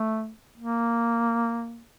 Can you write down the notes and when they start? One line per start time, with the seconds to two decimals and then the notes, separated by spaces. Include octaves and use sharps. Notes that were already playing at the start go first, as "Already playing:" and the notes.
Already playing: A3
0.58 A#3